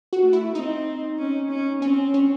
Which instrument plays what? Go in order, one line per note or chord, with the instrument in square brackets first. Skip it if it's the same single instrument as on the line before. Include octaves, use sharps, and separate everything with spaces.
[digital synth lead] F#4
[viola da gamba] A3
[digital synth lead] E4
[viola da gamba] C4 [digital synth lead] D#4
[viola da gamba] C#4
C#4
[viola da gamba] C4 [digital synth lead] C#4
[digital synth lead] C#4